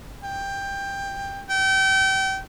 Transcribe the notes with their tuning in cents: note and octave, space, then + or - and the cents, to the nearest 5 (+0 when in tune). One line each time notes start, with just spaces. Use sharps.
G5 +15
G5 -30